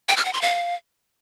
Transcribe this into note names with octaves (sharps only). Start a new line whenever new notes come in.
G5
F6
F#5
C6
F5